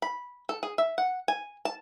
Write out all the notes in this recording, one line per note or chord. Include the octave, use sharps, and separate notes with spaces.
B5
A4
G#4
E5
F#5
G#5
A5